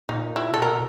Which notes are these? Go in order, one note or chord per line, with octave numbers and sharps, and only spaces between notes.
A#2 D#4
E4
C3 A4
B2 A#4